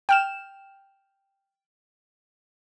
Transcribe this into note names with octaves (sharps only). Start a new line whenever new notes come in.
G5 F6 E7